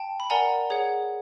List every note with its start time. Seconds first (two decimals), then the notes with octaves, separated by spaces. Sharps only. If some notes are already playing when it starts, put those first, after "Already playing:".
Already playing: G5 A5
0.20 B5
0.30 A#4 D5 F#5 G#5 A#5
0.70 G#4 C#5 F#5